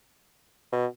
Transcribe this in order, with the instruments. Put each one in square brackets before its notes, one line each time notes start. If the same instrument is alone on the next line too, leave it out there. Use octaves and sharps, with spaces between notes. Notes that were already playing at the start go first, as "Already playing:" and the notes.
[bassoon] B2